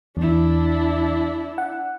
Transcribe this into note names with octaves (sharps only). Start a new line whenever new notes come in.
E2 D4 E4
F#5